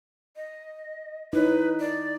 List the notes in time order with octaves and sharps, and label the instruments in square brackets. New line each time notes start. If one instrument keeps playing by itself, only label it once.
[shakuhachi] D#5
[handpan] D#4 [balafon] E4 C#5 [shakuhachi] B4
[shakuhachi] D5